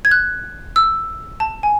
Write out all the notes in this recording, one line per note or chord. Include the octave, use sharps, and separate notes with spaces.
G#6
F#6
E6
A5
G#5